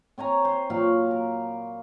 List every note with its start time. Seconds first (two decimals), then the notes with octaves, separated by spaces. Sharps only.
0.18 C4 C#5 G#5 A#5
0.45 C5
0.70 A#2 F#3 F5 B5
1.11 A#4